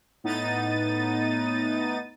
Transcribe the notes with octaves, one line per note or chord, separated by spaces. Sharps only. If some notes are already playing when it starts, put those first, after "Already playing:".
A2 B3 D#4 A6 D#7